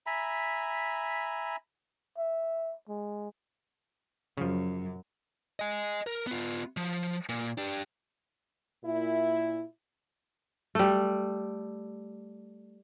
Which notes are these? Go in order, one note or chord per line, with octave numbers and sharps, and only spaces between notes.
E5 G#5 A#5 B5
E5
G#3
F#2 C#3 F3
D#5 G#5
A#4
B3 F4
F3
A#2
D4 G4
A#2 E4
G3 A3